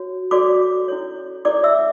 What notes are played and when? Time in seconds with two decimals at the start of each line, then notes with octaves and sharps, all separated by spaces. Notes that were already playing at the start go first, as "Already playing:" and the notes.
Already playing: F#4 C#5
0.31 F#4 A4 C#5 D5 D6
0.88 C#4 E4 A4 C#5
1.45 C#4 E4 A4 C#5 D5 D6
1.63 E5 E6